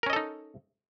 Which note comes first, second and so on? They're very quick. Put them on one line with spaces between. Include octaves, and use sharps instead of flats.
A#4 C#4 D#5 A4 D#4